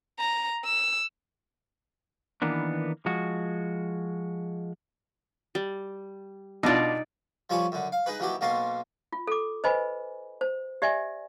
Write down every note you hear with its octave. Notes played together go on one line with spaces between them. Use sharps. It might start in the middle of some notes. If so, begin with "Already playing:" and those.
A#5
E6
D#3 E3 A#3 B3 D4
F3 G#3 F#4
G3
B2 D4 D#4 F4 D5
F3 G3 A4 C#5 G#5
F#2 D3
F5
D#4 G#4 B4
D#2 E3 F#3 G4
B1 B2 A#3 C#4 A5 C6
F4
A4 D6
B4 C5 D#5 G#5 B5
C5
G4 D5 E5 G#5